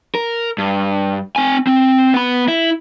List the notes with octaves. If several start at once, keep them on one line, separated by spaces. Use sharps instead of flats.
A#4
G2
C4 G#5
C4
B3 B5
E4